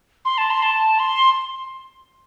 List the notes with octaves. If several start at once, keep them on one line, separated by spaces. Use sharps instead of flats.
C6
A5
C6
A5
C6